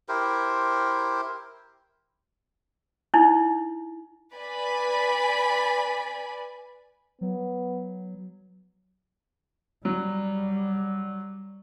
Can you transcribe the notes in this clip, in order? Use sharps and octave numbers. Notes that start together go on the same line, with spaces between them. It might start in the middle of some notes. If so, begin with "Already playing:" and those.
E4 G4 A#4 C5
D#4 E4
B4 D5 G#5 B5
F#3 B3
F#3 G3